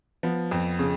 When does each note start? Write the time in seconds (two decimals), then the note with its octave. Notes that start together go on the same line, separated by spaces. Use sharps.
0.23 F3 B3
0.51 F2
0.79 C#3